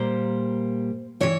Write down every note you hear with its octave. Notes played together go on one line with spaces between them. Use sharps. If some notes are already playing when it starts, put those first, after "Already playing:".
Already playing: A#2 G3 A#3 C5
C3 E3 C#5